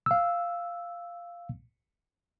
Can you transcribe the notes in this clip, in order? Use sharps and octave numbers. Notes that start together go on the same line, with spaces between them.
F5 E6